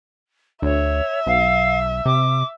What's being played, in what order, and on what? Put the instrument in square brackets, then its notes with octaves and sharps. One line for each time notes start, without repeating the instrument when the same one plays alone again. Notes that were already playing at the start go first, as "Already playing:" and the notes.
[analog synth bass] D2 [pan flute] C#5 [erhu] E5
[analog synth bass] B1 [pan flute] F5
[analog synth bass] C3 [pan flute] D6